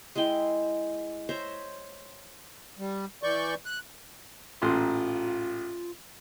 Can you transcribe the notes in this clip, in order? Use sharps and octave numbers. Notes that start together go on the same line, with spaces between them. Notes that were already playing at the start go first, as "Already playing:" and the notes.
G#3 E4 G#4 G5
C5 C#5 E5 A#5
G3
E3 D5 C#6 G6
F#6
A1 A#2 F4 C6